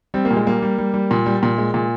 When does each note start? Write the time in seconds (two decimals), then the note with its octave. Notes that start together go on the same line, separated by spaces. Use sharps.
0.14 G3 C4
0.25 A#3
0.31 A#2
0.36 G#3
0.46 G3 A#3
0.62 G3
0.78 G3
0.94 G3
1.11 A#2
1.26 G3
1.43 A#2
1.58 G#3
1.74 A#2